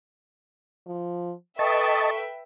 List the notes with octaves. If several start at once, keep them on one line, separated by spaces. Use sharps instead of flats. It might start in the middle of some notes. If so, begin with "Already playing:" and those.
F3
A4 B4 D#5 E5 G5 A5 C#6